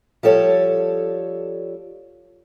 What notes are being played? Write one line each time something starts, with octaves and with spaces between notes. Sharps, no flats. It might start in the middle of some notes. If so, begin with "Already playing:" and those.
F3 G3 A4 C#5